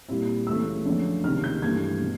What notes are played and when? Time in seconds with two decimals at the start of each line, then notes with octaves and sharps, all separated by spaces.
0.08 A#2 G3 C4 E4
0.47 C#2 C#3 E3 A3 E6
0.85 F#2 D3 F3 A3 D4
1.23 C#2 C3 D#3 F6
1.44 G6
1.62 G2 E3 A3 G#6
2.02 B2